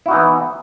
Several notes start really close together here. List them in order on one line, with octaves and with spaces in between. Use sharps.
E4 F#4 D#4 E3 B3